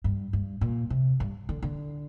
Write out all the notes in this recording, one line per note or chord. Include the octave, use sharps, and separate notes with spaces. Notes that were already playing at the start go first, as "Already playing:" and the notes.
G2
G2
A#2
C3
G2
D3
D3